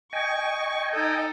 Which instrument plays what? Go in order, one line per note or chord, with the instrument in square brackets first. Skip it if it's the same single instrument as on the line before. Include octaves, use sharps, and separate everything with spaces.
[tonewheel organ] D#5 G5 G#5 [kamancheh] C#6
[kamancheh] D#4 A4